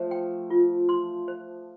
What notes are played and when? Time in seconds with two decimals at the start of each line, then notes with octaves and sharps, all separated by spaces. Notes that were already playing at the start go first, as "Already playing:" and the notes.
Already playing: F3 A3 C5
0.11 G5
0.50 F4
0.89 C6
1.28 C5